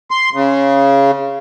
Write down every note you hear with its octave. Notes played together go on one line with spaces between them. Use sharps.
C6
C#3